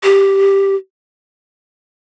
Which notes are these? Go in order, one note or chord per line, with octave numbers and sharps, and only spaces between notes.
G4